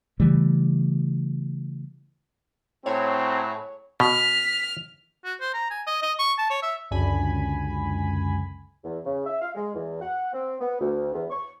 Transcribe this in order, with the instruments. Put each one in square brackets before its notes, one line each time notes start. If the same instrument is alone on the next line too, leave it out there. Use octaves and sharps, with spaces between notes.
[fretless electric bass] C#3 E3 G3 A3
[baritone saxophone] A2 [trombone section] C#3 F#3 [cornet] C4 [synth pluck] C#5
[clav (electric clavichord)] B2 [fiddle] F6 [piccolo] B6
[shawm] F#4
C5
A#5
G#5
D#5
D#5
C#6
A5
C#5
E5
[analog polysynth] C#2 F#2 D3 G#5 B5
[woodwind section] E2
C#3
E5
F5
G#3
E2
F#5
C4
B3
D2
E2
C#6